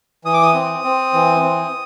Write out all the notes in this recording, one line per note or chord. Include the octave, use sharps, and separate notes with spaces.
E3 D#6
D6
D#6
C4
C4
E3
C4